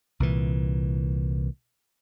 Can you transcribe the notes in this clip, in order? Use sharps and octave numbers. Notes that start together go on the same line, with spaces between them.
C2 A#2 E3